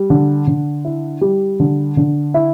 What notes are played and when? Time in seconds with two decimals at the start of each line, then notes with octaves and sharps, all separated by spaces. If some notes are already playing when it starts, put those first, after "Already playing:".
Already playing: G3
0.10 D3
0.47 D3
0.85 E4
1.21 G3
1.60 D3
1.97 D3
2.34 E4